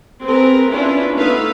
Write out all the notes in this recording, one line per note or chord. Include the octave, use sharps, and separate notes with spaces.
C4 G#4 A#4 B4
B3 C#4 D4 E4 F4 B4
A3 B3 D#4 B4 E5 F5